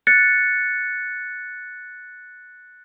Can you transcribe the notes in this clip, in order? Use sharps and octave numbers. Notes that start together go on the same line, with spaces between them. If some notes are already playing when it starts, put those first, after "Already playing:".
F#6 A6 C#7